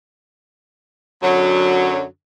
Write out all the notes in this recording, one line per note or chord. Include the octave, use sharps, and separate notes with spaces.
F#2 D3 F#3